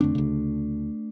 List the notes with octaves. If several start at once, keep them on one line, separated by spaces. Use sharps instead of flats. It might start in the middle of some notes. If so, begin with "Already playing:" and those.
F2 D3 A3 C4 D4
D2 C#3